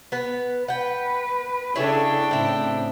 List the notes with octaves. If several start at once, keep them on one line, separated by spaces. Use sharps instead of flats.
B3 B4
B4 F#5 G5
C#3 D4 E4 G#4 A4 C#5 G5
A2 C#3 C4 E4